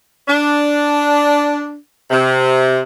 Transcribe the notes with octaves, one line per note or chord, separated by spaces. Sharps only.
D4
C3